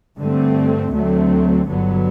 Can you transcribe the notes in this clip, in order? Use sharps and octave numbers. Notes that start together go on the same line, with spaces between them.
G2 D3 A3 C4
D2 D3 F#3 A3 C4
G1 G2 D3 F#3 B3